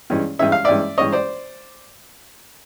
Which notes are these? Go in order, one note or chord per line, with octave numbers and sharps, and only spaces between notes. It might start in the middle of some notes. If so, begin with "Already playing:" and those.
G2 E3 G#3 C#4
G2 E3 G#3 C#4 E5
F5
G2 E3 G#3 C#4 D5 E5
G2 E3 G#3 C#4 C#5 D#5
C5 D5